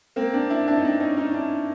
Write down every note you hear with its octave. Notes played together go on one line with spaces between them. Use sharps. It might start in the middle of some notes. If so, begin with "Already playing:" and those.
A#3 C4
C4 D4
D4 E4
D4 E4
D#4
C4 D4
C#4 D#4
C#4 D#4
D4 E4